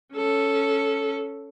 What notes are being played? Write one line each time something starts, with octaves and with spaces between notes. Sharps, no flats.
C#4 A4